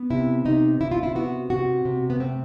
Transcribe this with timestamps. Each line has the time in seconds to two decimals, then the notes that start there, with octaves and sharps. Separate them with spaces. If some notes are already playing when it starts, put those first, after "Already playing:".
Already playing: B3
0.10 C3 E4
0.45 C3 D#4
0.80 C3 E4
0.91 F4
1.03 E4
1.15 B3 F#4
1.50 C3 F#4
1.85 C3
2.10 B3
2.20 A3 C4